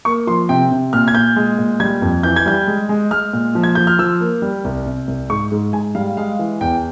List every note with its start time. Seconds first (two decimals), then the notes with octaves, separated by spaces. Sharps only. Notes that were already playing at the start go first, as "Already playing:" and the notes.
0.05 A#3 C#6
0.27 F3 C6
0.49 C3 G5
0.71 C3
0.93 A#2 F6
1.08 G#6
1.15 A#2 G6
1.36 G#3
1.58 A#2
1.80 G3 G#6
2.02 F2
2.23 E3 G6
2.36 G#6
2.46 G3 G6
2.67 G#3
2.89 G#3
3.11 G#3 F6
3.33 A#2
3.55 F3
3.63 G#6
3.75 F3 G6
3.87 F6
3.99 F3 E6
4.21 A#3
4.42 G3
4.64 C2
4.86 C3
5.07 C2
5.30 G#2 C#6
5.52 G#2
5.73 G#2 G#5
5.95 G3 F5
6.17 G#3 F5
6.39 E3
6.61 E2 G5